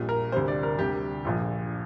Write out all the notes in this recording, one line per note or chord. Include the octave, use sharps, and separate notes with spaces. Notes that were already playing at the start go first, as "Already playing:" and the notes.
Already playing: A#1 A#2 G3
A#4
D2 C3 G3 C5
D5
A#4
D2 C3 G3 G4
A#1 A#2 F3